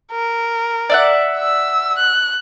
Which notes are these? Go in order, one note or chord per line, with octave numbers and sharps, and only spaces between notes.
A#4
D5 E5 F#5
E6
F#6